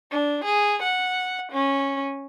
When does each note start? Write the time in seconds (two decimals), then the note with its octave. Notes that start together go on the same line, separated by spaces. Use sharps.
0.12 D4
0.45 G#4
0.82 F#5
1.52 C#4